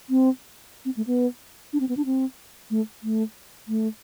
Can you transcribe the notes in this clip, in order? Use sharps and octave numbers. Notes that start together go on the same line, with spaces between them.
C4
C4
A3
B3
D4
C4
B3
D4
C4
A3
A3
A3